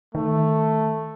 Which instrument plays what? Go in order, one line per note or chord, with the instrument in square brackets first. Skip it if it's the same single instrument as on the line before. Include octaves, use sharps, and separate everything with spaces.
[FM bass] D#3 [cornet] A3